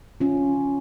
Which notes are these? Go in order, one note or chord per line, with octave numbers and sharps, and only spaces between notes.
C#4 F4